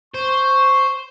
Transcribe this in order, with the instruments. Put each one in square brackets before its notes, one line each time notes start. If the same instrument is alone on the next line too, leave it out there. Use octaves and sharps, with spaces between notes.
[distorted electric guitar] C5 [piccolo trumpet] C#6